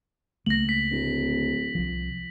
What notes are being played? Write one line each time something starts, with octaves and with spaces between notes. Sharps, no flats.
C#2 A3 A#3 A#6 F#7
B6
D1
C2 F3